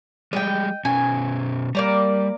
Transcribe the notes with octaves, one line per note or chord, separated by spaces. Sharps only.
G3 G#3 D#5 G5
B2 C#4 G#5
G3 A#3 D5 A#5